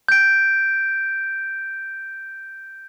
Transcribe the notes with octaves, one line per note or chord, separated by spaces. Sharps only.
G6 D7